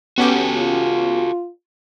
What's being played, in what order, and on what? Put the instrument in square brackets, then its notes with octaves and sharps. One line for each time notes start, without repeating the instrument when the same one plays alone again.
[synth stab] B3 C#4 G4 [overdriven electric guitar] F#4 A4
[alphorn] F4